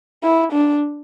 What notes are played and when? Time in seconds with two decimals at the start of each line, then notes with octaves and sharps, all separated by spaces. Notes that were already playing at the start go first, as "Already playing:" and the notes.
0.24 E4
0.53 D4